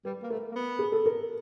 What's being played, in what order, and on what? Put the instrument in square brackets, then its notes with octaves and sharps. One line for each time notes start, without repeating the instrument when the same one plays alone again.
[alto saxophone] G3 [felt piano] B4
[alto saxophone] A#3
[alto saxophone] A3 [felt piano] A#4
[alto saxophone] A#3
B3
[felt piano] G#4
A4
A#4